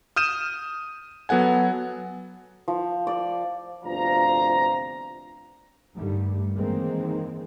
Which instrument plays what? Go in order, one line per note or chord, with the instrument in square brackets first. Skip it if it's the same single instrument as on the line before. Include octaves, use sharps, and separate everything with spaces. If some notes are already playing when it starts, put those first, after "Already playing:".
[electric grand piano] D#6 F6 G6 D#7 E7
F#3 B3 A4 F#5 G#5
[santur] F3
D5
[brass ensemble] G1 D2 C3 F3 F5 A#5
[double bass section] G2 D3 D#3 G3 A3
D#3 E3 G#3 A#3 C4